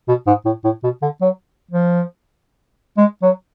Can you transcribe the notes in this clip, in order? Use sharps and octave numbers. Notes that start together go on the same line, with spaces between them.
B2
G#2
A2
A2
B2
D3
F#3
F3
G#3
F#3